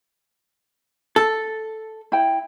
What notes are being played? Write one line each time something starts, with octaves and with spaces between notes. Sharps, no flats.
A4
E4 G5